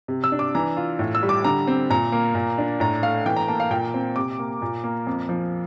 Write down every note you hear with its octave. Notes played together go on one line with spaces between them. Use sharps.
C3
E6
D4
D6
E3 A#5
F4
A2
E6
G3
D6
D3 A#5
C4
A#2 A#5
A#3
A#2
D4
A2 A#5
A3 F5
E3 G5
A#5
A#3 A5
F5
A#2 G5
C4
C3 D6
A#3
A#2
A#3
F2
F3